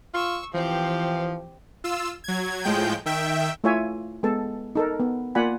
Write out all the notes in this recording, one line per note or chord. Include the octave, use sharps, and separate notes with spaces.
F4 C#6 E6
E3 F3 C4 G4
F4 E6
F#3 G#6
A2 F3 G#3 G5 G6
D#3 E5 G5
A3 E4 F4 C#5 E5 G#5
G#3 B3 A4 A5
D#4 A4 A#4
B3
A#3 F4 D5 F#5 G#5 B5